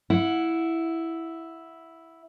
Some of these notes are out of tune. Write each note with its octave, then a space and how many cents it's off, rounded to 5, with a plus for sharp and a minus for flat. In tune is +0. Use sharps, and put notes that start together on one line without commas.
E4 +0 F#5 -20